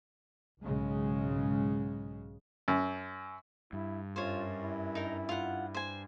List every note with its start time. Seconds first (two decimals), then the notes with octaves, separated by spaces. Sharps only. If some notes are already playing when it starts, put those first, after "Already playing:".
0.60 B1 G#2 C#3 G#3
2.68 F#2
3.73 G2 E4
4.16 F#2 F4 C5 C#5
4.60 E4
4.95 D#4 A#4
5.29 F4 F#5
5.74 C5 G#5